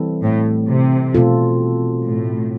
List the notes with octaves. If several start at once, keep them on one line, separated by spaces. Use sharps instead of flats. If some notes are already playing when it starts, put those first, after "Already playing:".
Already playing: E3 G3 C4 E4 A4
A2
C3
B2 A3 C4 F4 A4
A2